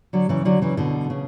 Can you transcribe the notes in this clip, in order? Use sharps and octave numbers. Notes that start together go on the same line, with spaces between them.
D3 F#3
C#3 E3
D3 F#3
C#3 E3
B2 D3
C#3